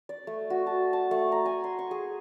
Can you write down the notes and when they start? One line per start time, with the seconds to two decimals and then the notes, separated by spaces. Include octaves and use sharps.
0.09 D5
0.27 A3
0.50 F#4
0.67 A5
0.93 A5
1.11 A3
1.32 A#5
1.46 G#5
1.64 C6
1.79 C#6
1.91 G#4